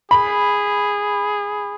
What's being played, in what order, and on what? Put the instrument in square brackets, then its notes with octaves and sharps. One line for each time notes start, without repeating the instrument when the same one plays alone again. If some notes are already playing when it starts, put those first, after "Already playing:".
[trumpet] G#4 [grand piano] B5